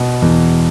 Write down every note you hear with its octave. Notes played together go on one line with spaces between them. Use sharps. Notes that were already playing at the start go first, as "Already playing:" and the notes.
Already playing: B2
E2